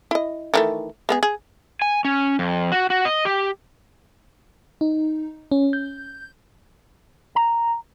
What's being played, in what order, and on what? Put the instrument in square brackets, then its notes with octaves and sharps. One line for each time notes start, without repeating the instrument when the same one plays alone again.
[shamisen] E4 D#5
D#3 E3 A3
G#3 B3 G#4
G#4
[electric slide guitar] G#5
C#4
F2
F#4
F#4
D#5
G4
[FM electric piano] D#4
C#4
G6
[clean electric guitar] A#5